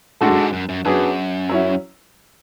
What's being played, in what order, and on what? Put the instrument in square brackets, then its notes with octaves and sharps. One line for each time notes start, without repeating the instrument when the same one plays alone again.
[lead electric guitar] A2 [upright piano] G#3 D4 F#4 A4
[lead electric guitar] F#2
G#2
F#2
F#2
[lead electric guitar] F#2 [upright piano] F#3 B3 D4 G#4
[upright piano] F#3 C#4 E4